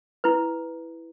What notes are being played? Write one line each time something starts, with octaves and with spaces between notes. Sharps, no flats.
E4 B4